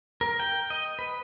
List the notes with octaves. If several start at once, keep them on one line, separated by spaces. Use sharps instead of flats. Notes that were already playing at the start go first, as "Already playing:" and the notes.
A#4
G5
D#5
B4